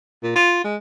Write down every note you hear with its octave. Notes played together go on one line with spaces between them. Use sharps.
A#2
F4
G#3